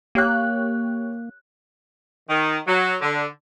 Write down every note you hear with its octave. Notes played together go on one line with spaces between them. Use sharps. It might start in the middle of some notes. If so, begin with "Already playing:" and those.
A#3 G4 C#5 F#6
D#3
F#3
D3